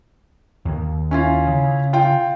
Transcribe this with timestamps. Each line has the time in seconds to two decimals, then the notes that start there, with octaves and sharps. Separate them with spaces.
0.65 D#2 D#3
1.11 C#4 E4 F4
1.47 C#3
1.93 F4 G5